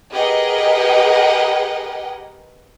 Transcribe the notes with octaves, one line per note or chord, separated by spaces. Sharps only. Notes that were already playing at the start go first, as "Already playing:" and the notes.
G4 G#4 A#4 B4 D#5 F#5